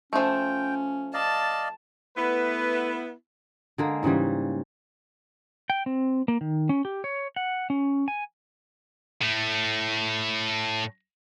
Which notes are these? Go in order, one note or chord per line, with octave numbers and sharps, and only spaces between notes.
F3 A3 C#4 G5
D5 D#5 F5 A5
A3 B3 E4 B4
D3 G#3 A#3
G#2 C#3 E3 G3
G5
C4
A#3
D#3
C#4
G4
C#5
F#5
C#4
G#5
A2 A3